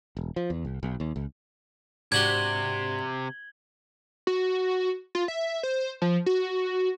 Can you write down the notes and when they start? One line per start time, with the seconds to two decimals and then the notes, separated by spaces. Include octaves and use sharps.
0.17 E1
0.36 F3
0.50 E2
0.65 C2
0.83 B1
1.00 D#2
1.16 C#2
2.12 G#2 C3 D4 F#4 G4 G#6 F#7 G7
4.27 F#4
5.15 F4
5.28 E5
5.63 C5
6.02 F3
6.26 F#4